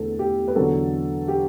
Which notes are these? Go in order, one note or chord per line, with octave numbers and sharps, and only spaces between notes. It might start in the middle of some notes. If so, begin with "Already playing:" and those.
Already playing: E2 D3 A3 A4
G4
B4
E2 D3 F#3 A4
G4